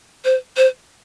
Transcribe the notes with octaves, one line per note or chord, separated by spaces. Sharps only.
C5
C5